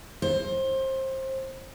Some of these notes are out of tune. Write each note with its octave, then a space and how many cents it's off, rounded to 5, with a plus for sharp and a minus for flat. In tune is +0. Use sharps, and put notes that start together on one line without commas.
C5 +25